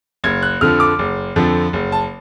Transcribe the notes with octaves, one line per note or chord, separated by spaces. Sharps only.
F#1 G#6
F#6
F2 D3 F3 F6
D6
F#1
F2 D3 F3
F#1
A5